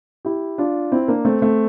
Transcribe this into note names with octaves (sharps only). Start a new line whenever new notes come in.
E4 G4
D4 F4
C4 E4
A#3 D4
A3 C4
A3 C4